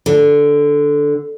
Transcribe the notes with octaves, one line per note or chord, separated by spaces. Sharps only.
D3